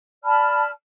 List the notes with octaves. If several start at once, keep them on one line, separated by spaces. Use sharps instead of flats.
D5 A5 B5 F6